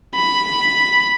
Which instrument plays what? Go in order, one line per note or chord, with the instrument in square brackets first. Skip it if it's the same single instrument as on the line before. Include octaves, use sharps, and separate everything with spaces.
[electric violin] B5